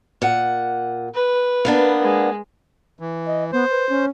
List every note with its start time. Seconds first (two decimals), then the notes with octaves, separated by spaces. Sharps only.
0.22 A#2 F#5
1.14 B4
1.65 A#3 B3 D4
2.02 G#3
2.99 E3
3.26 D#5
3.52 B3 C5
3.71 B4
3.89 C#4